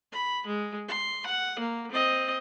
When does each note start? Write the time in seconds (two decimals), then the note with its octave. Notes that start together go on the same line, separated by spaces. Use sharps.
0.12 B5
0.46 G#3
0.88 C6
1.26 F#5
1.59 A#3
1.91 C4 D#5